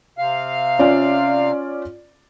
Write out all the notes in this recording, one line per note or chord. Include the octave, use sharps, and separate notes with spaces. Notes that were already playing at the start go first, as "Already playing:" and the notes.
C3 F5 F6
C#4 F4 D5